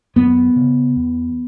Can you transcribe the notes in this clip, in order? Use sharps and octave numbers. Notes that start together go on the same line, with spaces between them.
F#2 B3
C#3
E2